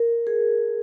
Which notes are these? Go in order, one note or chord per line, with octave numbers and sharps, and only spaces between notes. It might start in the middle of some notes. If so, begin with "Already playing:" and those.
Already playing: A#4
G#4